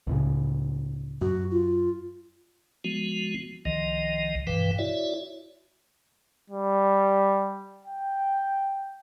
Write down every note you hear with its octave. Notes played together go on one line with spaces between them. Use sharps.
C#2 A2 C#3
F#2 F#4
F4
F3 G#3 B3 F#4
C2 D#3 F3 D#5
G2 B2 E3 B4 F5 G5
E4 F#4 C#5 D5 E5
G3
G5